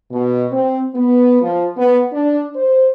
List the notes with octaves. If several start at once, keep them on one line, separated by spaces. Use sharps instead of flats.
B2
C4
B3
F3
B3
D4
C5